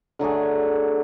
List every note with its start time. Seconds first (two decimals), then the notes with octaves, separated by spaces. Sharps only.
0.19 D3 F#3 A3 G#4